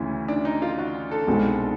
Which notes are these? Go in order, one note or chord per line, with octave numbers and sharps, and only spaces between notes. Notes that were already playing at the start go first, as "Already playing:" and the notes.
Already playing: D2 C#3 E3 C#4
D4
D#4
F4
F#4
A4
C2 B2 G#3 C4